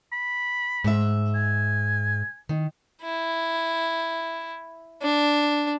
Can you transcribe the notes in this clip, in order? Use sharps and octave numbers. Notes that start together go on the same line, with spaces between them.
B5
G#2 E5
G#5
D#3
E4
D4